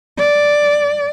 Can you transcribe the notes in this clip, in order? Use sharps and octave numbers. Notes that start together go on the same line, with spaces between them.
D5